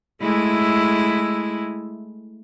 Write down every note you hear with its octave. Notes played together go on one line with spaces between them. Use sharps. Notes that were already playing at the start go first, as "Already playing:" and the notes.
G#3 A3 E4